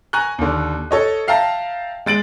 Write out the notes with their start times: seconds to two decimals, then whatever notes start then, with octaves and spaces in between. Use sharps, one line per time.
0.13 G#5 A#5 C#6 F#6
0.38 D#2 D3
0.91 A4 C#5 D#5
1.27 E5 F5 G5 A5 A#5
2.06 G#3 A6 D7 F#7